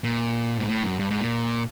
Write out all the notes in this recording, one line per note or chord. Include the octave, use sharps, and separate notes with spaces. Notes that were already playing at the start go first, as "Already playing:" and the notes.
A#2
G#2
A2
F#2
G2
G#2
A#2